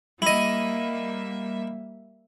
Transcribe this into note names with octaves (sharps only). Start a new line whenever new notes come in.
G3 A#3 E4 D#5 E5